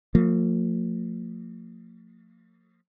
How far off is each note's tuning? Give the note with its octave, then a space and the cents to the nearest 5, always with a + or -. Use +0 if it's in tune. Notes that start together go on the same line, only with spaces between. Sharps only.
F3 +30 A#3 -45